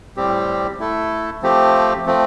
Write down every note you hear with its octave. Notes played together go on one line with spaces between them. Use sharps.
A2 G3 C4 G4
A3 E4 A4
F3 A3 C4 G4
F3 A3 C4